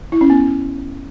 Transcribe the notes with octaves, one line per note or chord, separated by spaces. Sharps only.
E4
C#4
B3